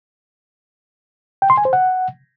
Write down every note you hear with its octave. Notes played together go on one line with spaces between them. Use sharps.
G5
C6
G#5
C5
F#5